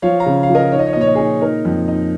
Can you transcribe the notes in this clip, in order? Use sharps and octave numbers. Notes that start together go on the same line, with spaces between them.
F3 C#5 F5
F5 A#5
C#3
F5
F3
A#4 D#5
D#4 C#5
D#5
C#5
D#5
A#2
C#5
D#5
D#4 G#4 C#5
D#4 A#4
F2
D#4